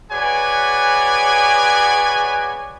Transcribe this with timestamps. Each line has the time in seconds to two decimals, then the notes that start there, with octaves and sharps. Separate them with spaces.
0.10 F#4 G#4 B4 C#5 D5 G#5